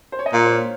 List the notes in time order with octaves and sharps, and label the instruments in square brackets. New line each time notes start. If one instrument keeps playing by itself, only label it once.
[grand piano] C5
C#5
D#5
[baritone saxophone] A#2 [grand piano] F5
[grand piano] C5
C#5